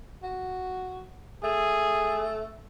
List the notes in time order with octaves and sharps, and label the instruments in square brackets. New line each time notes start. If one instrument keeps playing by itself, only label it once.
[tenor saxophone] F#4
[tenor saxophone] A3 [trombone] G#4